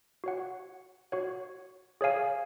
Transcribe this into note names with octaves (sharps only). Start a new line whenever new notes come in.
F#4 C#5 F#5
F#4 C#5 F#5
G#4 C#5 F5 G#5